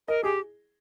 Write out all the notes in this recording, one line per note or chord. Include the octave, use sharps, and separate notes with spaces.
A#4 D#5
G4 G#4